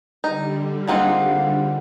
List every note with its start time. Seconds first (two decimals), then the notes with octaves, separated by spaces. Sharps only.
0.24 D3 G3 D#4
0.87 G#3 A#3 C4 D#4 F4 F5 F#5